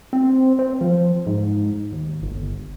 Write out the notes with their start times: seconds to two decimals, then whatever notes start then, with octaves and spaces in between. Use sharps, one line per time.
0.13 C4
0.59 C4
0.81 F3
1.27 G#2
1.92 D#2
2.22 G1